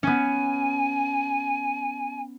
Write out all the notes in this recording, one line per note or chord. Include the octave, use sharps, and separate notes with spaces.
B3 C#4 G#5